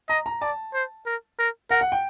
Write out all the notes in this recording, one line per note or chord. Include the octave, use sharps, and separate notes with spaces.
D#5 A#5
A#5
D5 A5
C5
A#4
A#4
A#4 F#5
F#5
G5